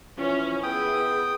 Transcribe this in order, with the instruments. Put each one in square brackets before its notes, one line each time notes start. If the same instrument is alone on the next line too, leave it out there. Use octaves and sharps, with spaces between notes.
[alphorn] E3 [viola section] F3 C#4
[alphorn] B3 [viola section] E4 G#4 [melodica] G5 D#6